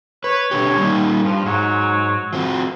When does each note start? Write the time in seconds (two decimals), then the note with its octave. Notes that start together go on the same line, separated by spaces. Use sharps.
0.24 B4 C#5
0.51 B2 D3 G4
0.78 G3 A#3 D#4
1.25 G2 F3
1.46 G#2 F#3
2.33 F3 C4 F#4